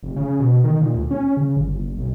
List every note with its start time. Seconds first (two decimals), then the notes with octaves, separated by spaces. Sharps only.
0.03 F1
0.16 C#3
0.40 B2
0.64 D#3
0.81 A#2
0.94 D2
1.11 C#4
1.37 C#3
1.57 G1
1.77 F#1
1.97 B1